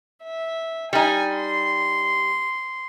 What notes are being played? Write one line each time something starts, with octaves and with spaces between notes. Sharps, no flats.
E5
G3 D#4 G#5
C6